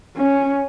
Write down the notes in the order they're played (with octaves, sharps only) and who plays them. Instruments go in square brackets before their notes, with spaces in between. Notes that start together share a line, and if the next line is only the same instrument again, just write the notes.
[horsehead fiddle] C#4